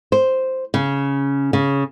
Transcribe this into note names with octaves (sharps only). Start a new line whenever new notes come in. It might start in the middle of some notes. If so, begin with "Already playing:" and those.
C5
C#3
C#3